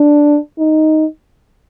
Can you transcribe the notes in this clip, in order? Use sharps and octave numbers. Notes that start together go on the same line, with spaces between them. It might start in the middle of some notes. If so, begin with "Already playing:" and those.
Already playing: D4
D#4